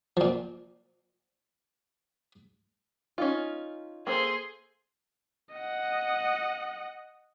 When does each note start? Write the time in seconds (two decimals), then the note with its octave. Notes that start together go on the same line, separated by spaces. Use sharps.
0.17 A#2 F3
3.18 C#4 D#4 F4
4.07 A#3 G#4 A4 C5 C6
5.54 D#5 F#5